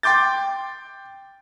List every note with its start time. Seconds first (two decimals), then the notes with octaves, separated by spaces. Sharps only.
0.03 G5 C6 D6 G6 A6